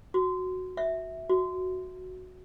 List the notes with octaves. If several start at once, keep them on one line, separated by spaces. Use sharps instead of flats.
F#4
E5
F#4